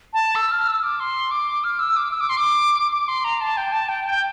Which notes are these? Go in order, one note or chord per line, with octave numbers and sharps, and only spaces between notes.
A5
E6
F6
E6
D6
C6
D6
F6
E6
D6
E6
D6
C6
D6
D6
C6
A#5
A5
G5
A5
G5
G5